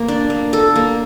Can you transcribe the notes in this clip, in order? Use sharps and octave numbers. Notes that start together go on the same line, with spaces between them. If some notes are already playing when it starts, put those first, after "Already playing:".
Already playing: A#3
D4
A#3
A4
A#3